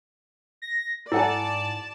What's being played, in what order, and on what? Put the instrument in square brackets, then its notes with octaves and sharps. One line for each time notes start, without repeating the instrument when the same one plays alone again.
[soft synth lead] A#6
[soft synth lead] G#2 [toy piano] E4 [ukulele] A4 F#5 G#5 [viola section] D5 A5